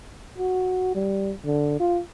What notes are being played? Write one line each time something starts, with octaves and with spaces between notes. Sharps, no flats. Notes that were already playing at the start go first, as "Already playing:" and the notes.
F#4
G3
D3
F4